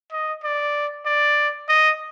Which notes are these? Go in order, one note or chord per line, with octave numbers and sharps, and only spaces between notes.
D#5
D5
D5
D#5